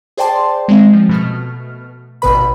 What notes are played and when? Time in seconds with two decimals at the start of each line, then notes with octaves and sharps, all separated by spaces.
0.17 G#4 C5 D5 G5 A5 C6
0.68 G#3 C4
0.93 F3
1.09 B2 A3 F6
2.22 A1 B2 B4 B5